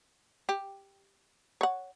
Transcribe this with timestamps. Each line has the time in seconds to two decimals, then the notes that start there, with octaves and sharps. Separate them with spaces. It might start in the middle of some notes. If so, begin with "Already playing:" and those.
0.49 G4
1.61 C#5 F#5